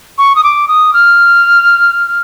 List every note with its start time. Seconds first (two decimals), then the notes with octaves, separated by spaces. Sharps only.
0.18 C#6
0.36 D#6
0.44 D6
0.68 D#6
0.94 F6